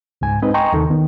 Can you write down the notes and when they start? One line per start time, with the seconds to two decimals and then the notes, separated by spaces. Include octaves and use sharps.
0.21 C#2 G#2 G#5
0.42 G#3 C4 D#4 B4 D#5
0.54 D#5 G5 G#5 A#5 C6 C#6
0.73 D#2 C3 D#3 A4
0.90 D#3 B3